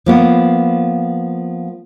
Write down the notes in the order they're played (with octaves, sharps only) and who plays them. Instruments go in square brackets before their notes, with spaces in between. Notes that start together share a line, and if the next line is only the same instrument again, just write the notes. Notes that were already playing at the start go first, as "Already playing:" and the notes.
[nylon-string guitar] F3 A#3 B3